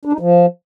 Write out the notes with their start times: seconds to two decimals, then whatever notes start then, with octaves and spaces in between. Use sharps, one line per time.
0.05 D4
0.13 D#4
0.20 F3